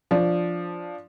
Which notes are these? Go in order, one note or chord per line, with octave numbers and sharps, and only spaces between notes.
F3 D4